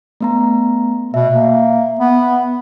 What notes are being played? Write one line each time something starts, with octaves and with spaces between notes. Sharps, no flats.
A3 B3 A#5
B2 E5
A#3
B3